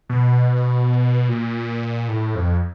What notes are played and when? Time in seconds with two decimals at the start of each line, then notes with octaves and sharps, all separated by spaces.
0.10 B2
1.28 A#2
2.08 A2
2.35 F2